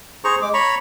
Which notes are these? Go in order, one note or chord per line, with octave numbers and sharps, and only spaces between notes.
G#4 C5 A#5 C#6
G#3 D6
C#5 A#5 B5 C#6